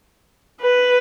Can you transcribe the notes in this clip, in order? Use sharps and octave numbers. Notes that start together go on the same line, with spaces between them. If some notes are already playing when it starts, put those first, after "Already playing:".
B4